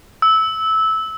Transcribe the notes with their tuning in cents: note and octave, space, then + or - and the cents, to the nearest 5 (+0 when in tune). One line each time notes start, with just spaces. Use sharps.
E6 -15